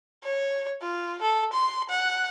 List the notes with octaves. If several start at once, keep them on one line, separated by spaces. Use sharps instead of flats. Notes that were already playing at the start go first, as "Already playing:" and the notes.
C#5
F4
A4
C6
F#5